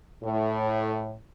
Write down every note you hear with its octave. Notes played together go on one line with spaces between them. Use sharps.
A2